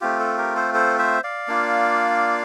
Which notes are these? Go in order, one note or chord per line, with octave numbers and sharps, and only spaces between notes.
A3 C4 F4 G4
A4
G4 A#4
A4 C5
A4 C5
C5 E5
D5 F5
A#3 D4 F4